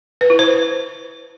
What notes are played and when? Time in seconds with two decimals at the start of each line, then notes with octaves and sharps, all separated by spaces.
0.21 B4
0.30 E4
0.39 C5